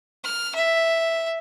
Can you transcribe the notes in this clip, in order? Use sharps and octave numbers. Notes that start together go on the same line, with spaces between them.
F6
E5